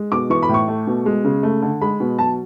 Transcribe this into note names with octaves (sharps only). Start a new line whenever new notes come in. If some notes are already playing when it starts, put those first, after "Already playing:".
Already playing: G#3
B2 D6
E3 C#6
B5
A2
C#6
A3
B2
G#3
C#3
A3
D3
G#3 B5
B2
F#3 A5